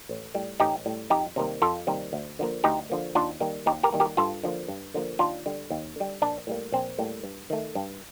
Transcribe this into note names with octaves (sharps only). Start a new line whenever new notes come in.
A1
A2 G3
A1 D#4 G4
A2 G3
F2 D#4 G4
C3 D#3 G3 A#3
F2 F4 A4
C3 D#3 G3 A#3
D2
D3 F3 A#3
D2 D#4 G4
D3 F3 A#3
D#2 D4 F4
D#3 G3 A#3
D#2 D#4 G4
G4 A#4
D#3 G3 A#3
G4 A#4
G2 F4 A4
D3 F3 A#3
G2
D3 F3 A#3
D#2 D4 F4
D3 G3
D#2
D3 G3
A#1 D4
A2 G3 A#3
A#1 C4
A2 G3 A#3
G2
D#3 A3
G2